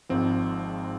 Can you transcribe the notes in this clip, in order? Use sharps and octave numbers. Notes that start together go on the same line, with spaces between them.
G#1 G#2 F3 C4